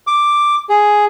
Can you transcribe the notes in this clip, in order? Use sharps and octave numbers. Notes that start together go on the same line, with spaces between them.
D6
G#4